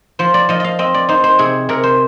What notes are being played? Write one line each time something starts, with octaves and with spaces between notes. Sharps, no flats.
F3 C5
D5
F3 D#5
D#5 F5
C4 D#5
D5
D#4 C5
C5
C3 G#4
C3 A#4
C5